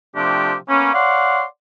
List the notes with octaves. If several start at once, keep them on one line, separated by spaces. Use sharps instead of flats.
C3 F3 A3 D4 G4
A#3 B3 C#4
C#5 D5 F5 F#5 C6